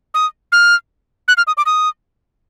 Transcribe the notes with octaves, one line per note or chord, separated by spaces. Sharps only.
D#6
F6
F#6
F6
D#6
D6
D#6